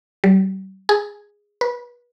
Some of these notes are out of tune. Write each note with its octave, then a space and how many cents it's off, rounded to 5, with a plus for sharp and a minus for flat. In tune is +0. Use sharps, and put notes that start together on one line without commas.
G3 -40
G#4 -5
B4 -30